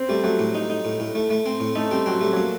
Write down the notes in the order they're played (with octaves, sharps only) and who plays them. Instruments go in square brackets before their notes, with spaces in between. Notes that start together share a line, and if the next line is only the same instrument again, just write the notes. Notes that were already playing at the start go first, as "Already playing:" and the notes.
Already playing: [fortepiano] C4
[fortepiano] G3 [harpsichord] A3
[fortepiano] F#3 [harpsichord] A3
[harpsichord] A2
D#4
D#4
A2
A2
A3
A3
C4
A2
[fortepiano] A3 [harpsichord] D#4
[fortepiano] G3 [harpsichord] C4
[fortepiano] F#3 [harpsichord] C4
[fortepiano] G3 [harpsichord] A3
[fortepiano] F#3 [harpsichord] A#3